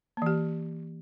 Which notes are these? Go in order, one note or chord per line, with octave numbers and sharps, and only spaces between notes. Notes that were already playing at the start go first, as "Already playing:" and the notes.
E3 A#3 G4